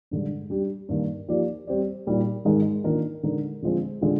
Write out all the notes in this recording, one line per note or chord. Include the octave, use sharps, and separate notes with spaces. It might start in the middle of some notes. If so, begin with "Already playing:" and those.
G2 D3 G#3
G3 D4 G4
G2 D#3 A#3 D#4
F3 A#3 D#4 G4 D5
G3 C4 G4 D5
A#2 G3 A#3 D#4
G#2 D#3 G#3 D#4 A#4
D#3 A#3 D4 F4 A#4
D3 G#3 D#4 A#4
D3 F3 G#3 C4
D3 G#3 D4 F4